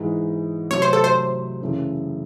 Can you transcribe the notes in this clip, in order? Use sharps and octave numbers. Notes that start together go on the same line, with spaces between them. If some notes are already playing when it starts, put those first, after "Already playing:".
Already playing: G#2 E3 G#3 D#4
C3 F#3 A3 C#5
C5
A4
C5
F#2 C#3 E3 A3